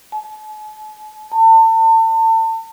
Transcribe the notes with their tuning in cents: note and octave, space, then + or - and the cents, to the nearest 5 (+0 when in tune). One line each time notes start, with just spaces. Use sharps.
A5 -45
A5 +35